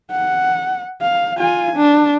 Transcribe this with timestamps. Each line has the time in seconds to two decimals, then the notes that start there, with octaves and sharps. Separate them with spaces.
0.11 F#5
1.01 F5
1.38 F4 G#5
1.76 D4